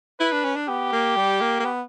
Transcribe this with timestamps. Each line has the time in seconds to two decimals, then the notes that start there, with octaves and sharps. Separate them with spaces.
0.20 E4 B4
0.32 D4
0.44 C#4
0.56 D4
0.68 B3 G4
0.92 A#3
1.16 G3
1.41 A#3
1.60 A#3
1.65 B3